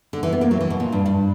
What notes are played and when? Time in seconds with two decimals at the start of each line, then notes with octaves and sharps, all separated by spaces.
0.13 D3
0.23 E3
0.32 B3
0.41 A#3
0.51 F#3
0.61 E3
0.70 B2
0.80 A#2
0.92 G2
1.06 G2